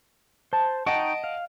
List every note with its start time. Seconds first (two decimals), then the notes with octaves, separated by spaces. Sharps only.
0.53 C5 A5
0.86 D#4 D#5 F#5 G5 A5 C#6 D7
1.24 F5